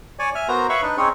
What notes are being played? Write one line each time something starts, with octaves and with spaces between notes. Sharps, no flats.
C#5 D5 G#5
E5 G#5 F6
B3 F#4 A#4 C5 A#5
B4 C#5 E5 F5 B5 C#6
D4 D#4 B4
C4 C#4 D#4 G#4 C#5